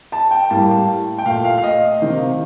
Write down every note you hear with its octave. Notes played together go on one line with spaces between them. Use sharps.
A5
G5
A2 G3 A#3 A5
G5
A#2 A3 F5
F5
F5
D#5
C3 D#3 A#3